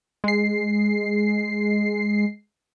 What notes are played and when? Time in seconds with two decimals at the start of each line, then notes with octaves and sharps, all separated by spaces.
0.24 G#3 C7